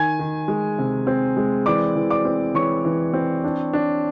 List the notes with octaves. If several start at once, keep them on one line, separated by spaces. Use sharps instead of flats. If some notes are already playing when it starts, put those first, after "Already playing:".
Already playing: D#3 G#5 G#6
D#3
G#3
C3
C4
G#3
E3 D5 D6
E3
D5 D6
C4
E3 C#5 C#6
E3
C4
D4
D4